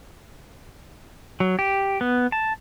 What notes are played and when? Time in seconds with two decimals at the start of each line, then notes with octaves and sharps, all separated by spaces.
1.40 F#3
1.59 G4
2.01 B3
2.32 A5